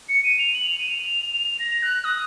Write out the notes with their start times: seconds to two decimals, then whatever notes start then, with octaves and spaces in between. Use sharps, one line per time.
0.09 C#7
0.24 D#7
0.39 F7
0.55 F#7
0.69 F7
0.78 D#7
0.89 F7
1.59 A#6
1.82 F#6
2.04 D#6